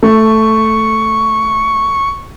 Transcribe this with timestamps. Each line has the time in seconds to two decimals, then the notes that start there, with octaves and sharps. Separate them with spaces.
0.03 A3 C#6